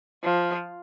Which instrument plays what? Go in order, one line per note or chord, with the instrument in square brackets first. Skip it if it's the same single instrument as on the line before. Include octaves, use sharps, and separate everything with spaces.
[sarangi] F3